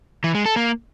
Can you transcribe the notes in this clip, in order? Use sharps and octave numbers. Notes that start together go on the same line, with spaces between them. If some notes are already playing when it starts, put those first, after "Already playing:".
E3
G#3
A4
A#3